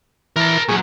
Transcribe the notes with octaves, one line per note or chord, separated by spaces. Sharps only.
E3 A#4 A5
A#2 F#3 G#4 C#6